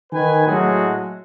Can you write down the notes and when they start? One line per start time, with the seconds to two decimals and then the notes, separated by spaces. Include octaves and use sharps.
0.13 D#3 B4 G#5
0.47 A2 F#3 G#3 A3 F#4 G#4